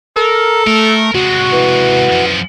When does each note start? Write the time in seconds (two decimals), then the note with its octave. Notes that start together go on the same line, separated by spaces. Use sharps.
0.16 A4 A#4
0.67 A3 A#4
1.15 C3 G#3 F#4
1.52 E3
2.12 F#2 F3